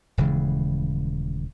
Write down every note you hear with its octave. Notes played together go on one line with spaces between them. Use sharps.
D#1 C#3 E3 G#3